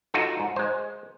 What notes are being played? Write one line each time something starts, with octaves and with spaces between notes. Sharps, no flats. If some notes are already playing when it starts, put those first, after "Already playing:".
D#4 F4 F#4 A4
G#2
G#3 C5